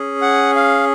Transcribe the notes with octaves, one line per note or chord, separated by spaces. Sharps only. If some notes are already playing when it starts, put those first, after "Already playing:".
Already playing: C#4 G#4
F#5
F5